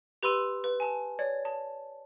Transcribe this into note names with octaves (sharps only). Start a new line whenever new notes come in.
G4 B4 B5 C6 E6 D#7
B4
G#5 A5
C#5 D5 G#6
A5